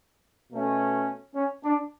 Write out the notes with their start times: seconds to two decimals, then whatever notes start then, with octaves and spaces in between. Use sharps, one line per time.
0.50 B2 A3 C#4
1.35 C#4
1.64 D4